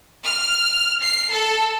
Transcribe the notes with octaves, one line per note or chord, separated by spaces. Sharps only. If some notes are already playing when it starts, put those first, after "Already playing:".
F6
C7
A4